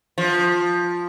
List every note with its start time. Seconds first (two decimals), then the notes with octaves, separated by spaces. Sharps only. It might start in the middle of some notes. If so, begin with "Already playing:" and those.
0.18 F3